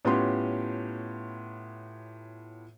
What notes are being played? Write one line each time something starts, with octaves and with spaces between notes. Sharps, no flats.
A2 B3 C#4 F4 G4 C6